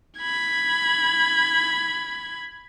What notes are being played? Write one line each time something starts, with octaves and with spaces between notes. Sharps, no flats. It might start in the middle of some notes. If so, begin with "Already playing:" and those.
B5 G#6